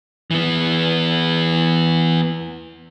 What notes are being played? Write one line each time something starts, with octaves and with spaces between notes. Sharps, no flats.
E3 B3